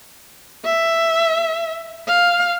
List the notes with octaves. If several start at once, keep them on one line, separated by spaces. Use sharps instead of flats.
E5
F5